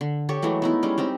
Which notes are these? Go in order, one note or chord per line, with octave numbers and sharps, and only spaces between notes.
D3
G4 A4 C#5
E3 F#3 G#3 A3
B3 D#4 E4
G3 G#3 C#4
C4 D#4 G4